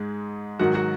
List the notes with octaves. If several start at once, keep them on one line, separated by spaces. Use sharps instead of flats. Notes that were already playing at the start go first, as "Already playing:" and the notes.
Already playing: G#2 G#3
G#2 D#3 F#3 F#4 F#5
F#4 F#5